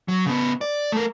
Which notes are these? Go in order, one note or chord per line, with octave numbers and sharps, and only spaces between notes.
F#3
C#3 B3
D5
A3 A#4